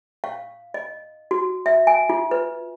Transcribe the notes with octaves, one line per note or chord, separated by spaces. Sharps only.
F5
D#5
F#4
E5
G#5
F4
B4